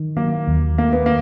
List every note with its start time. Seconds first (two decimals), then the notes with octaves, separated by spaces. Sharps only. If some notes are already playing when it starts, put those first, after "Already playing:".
Already playing: D#3
0.17 F#3 A#3
0.47 D#2
0.78 A3 A#3
0.93 B3
1.06 A#3